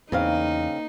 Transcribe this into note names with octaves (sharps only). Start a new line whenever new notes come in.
E2 C#3 A#3 C4 D#4 F5